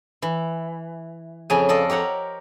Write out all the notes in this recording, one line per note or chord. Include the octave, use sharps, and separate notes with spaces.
E3
F2 C#3 C#4 G#4 G#5
F4 G#4 A4 D5 D#5
G4 A#4 C#5 F#5